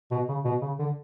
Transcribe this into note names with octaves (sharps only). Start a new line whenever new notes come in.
B2
C#3
B2
C#3
D3